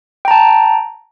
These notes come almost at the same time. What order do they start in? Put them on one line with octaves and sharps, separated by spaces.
G5 A#5 A5